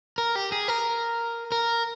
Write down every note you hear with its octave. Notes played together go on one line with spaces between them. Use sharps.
A#4
G4
G#4
A#4
A#4